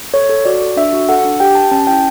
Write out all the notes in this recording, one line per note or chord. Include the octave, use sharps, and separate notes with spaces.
A4 C#5
A4
F#4 D5
A4
D4 E5
F#4
A4 F#5
D4
G4 G5
G4 A5
C#4 A5
E4 G5